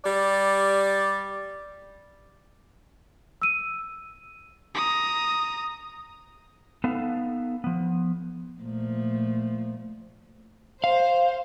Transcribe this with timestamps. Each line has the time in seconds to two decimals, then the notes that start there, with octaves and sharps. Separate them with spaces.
0.05 G3 D5
3.42 E6 D#7
4.74 A#5 D#6
6.84 B3 D#4 A4 F5
7.64 F3 B3
8.61 A#2 F3 A3
10.84 C5 F5